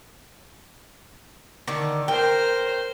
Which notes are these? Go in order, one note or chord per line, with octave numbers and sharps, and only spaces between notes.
D3 D#3
A#4 C5 G5